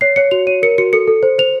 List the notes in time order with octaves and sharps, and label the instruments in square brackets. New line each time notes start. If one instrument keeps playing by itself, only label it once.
[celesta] C#5 C7
C#5 C#7
F#4 F7
C#5 D#7
A#4 C#7
F#4 C#7
A4 C#7
A4
C5
C5 F7